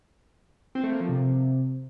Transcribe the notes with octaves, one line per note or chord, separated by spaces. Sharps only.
C4
A3
A#3
F3
C3